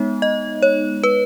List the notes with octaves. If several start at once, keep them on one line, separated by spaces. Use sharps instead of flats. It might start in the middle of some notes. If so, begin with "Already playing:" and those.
Already playing: G#3 B3 D#4
D#5
C#5
B4